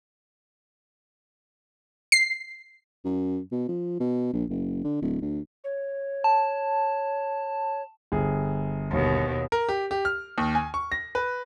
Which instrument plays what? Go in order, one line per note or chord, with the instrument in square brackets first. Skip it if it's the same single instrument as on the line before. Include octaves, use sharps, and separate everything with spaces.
[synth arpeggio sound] C7
[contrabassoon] F#2
B2
F3
B2
A#1
F#1
D3
D1
D2
[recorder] C#5
[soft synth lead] A5
[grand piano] G1 G#4
[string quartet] D#2 B2
[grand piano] A#4
G4
G4
F6
D#2
G#5
C#6
A#6
B4